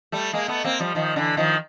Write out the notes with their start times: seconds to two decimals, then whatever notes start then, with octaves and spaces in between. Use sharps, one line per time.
0.12 G3 A3
0.33 G#3 A#3
0.48 A3 B3
0.64 A#3 C4
0.80 F3 G3
0.95 D#3 F3
1.16 D3 E3
1.37 D#3 F3